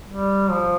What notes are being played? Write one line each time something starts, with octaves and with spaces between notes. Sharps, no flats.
G3
F3